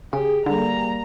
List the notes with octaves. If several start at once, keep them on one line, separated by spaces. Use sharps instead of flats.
C#3 G4 G#4
D3 G3 A#3 A#5